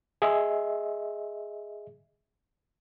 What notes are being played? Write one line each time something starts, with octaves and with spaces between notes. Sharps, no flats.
G#4 D#5 E5